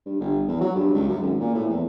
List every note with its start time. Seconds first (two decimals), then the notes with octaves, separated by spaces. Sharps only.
0.05 G2
0.20 G1
0.48 E2
0.61 F#3
0.76 G2
0.93 C#2
1.08 F#2
1.23 G#1
1.40 A#2
1.54 A2
1.69 E2